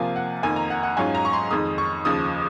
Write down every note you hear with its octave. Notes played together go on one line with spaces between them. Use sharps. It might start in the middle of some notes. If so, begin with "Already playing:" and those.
Already playing: C3 F3 A#3 F4 G#5
F#5
F2 D#3 A#3 G#5
A#5
F#5
F#5
G#2 F#3 C#4 F4 G#5
A#5
C#6
C6
F2 D#3 G#3 D#6
C#6
D#2 C#3 F3 D#6